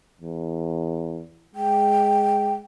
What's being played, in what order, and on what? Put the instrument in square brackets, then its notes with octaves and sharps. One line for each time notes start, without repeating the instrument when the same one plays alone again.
[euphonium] E2
[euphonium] G#3 [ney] G5